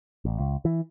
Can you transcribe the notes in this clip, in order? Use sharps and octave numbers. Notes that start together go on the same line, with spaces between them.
A1
C#2
E3